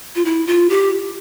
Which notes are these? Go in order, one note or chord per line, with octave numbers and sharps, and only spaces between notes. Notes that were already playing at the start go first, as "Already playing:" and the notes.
F4
E4
F4
G4